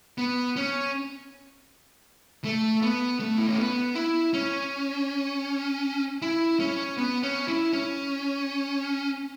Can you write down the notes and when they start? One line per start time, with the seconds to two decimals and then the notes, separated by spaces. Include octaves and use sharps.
0.18 B3
0.56 C#4
2.44 A3
2.82 B3
3.20 A3
3.38 E4
3.48 C#4
3.58 B3
3.95 E4
4.33 C#4
6.22 E4
6.60 C#4
6.98 B3
7.23 C#4
7.48 E4
7.73 C#4